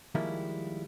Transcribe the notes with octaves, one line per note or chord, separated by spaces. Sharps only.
D#3 F3 G3 G#3 A#3 E4